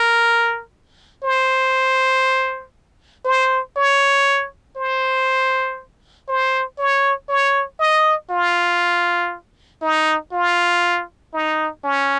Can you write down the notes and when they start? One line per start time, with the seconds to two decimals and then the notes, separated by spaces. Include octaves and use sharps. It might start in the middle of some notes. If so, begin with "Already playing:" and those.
Already playing: A#4
1.23 C5
3.25 C5
3.76 C#5
4.77 C5
6.29 C5
6.78 C#5
7.29 C#5
7.80 D#5
8.30 F4
9.82 D#4
10.32 F4
11.34 D#4
11.83 C#4